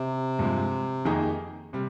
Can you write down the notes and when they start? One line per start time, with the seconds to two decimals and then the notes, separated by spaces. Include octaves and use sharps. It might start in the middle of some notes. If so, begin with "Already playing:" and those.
Already playing: C3
0.39 G2 F3 G#3
1.05 F2 D#3 A#3 D#4 G#4
1.73 C3 G3